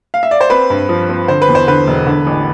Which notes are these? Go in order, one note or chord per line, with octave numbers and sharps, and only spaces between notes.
F5
E5
D5
C5
C4 B4
G2
F3
C4
D3 C5
B4
E2
C5
D3 B4
E1
D3
A1